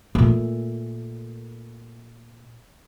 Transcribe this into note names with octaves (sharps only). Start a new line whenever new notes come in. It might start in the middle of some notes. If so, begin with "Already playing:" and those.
A#2 A3